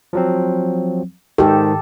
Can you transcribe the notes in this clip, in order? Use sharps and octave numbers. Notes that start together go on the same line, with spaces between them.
F3 F#3 C4
G#2 D#3 G4 A4